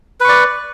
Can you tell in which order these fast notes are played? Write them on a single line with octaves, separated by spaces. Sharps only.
B4 C#6 D5